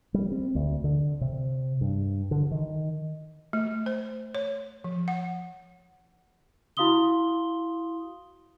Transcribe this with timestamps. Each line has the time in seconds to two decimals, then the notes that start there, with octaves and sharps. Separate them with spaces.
0.14 G3
0.32 C4
0.55 D2
0.84 D3
1.21 C3
1.81 G2
2.31 D3
2.51 D#3
3.53 A3
3.86 C5
4.35 C#5
4.84 F3
5.08 F#5
6.77 E4 F#4 F5 C6 D#6 G7